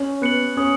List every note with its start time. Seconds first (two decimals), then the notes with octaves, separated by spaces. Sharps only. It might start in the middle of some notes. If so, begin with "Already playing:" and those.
Already playing: C#4
0.22 B3 F#6 C#7 F#7
0.57 C#4 D#6